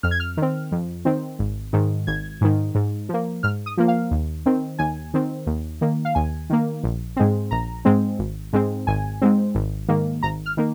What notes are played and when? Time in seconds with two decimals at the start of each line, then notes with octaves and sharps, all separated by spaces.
0.03 F2 F6
0.11 G#6
0.20 F6
0.37 D#3 C4
0.72 F2
1.05 D#3 C4
1.39 G#1
1.73 G#2 D#3
2.07 G#1 G#6
2.41 G#2 D#3
2.75 G#2
3.09 F3 A#3
3.43 G#2 F6
3.66 D#6
3.77 F3 A#3
3.88 F5
4.11 D#2
4.46 D#3 C4
4.79 D#2 G#5
5.14 D#3 C4
5.47 D#2
5.81 D#3 A#3
6.05 F5
6.15 D#2 G#5
6.50 D#3 A#3
6.84 A#1
7.16 G#2 G#3 C4
7.51 A#1 A#5
7.85 G#2 G#3 C4
8.19 G#1
8.53 G#2 G#3 C4
8.87 G#1 G#5
9.22 G#2 G#3 C4
9.55 G#1
9.88 G#2 D#3 A#3
10.23 G#1 A#5
10.46 F6
10.57 D#3 A#3